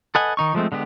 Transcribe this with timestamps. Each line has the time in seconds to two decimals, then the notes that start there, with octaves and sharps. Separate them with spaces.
0.15 A4 B4 D#5 F#5 G#5
0.37 D#3 D#4 C#6
0.55 F3 G#3 A3 C4
0.72 D3 G#3 B3 G4